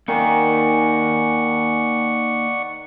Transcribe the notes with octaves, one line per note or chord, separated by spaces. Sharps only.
D#3 A#3 D#4 D5 F5 F#5 G#5 C#6